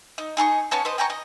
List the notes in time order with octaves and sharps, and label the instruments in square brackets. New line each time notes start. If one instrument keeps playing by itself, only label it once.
[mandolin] D#4
D#4 G#4 A#5 C#6
B3 C#4 C#5 A5
B4 C5 D#5
G5 G#5 A#5 C#6
D#5